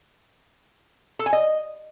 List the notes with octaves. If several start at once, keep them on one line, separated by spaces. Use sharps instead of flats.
A4
G#5
D#5